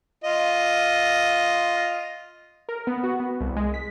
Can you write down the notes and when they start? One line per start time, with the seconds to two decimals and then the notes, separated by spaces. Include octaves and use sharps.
0.24 F4 D#5
2.69 A#4
2.87 B3
3.03 F#4
3.20 B3
3.40 C2
3.56 G#3
3.74 B6